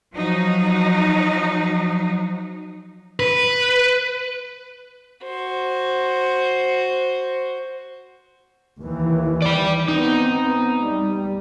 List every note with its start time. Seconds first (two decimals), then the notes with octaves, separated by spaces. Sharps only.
0.14 F3 F#3 D#4
3.20 B4
5.23 F#4 C5
8.81 D#2 E3
9.42 D5 G5
9.88 B3 C4 D#4
10.79 G3